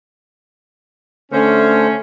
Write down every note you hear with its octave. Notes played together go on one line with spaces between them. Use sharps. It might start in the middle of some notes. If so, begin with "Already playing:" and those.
D3 A3 C#4 C5